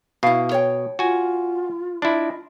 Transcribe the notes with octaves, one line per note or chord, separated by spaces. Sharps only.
B2 E4 F5
C#5 G5
F4 F#4 G#5
D4 E4 F4 D#5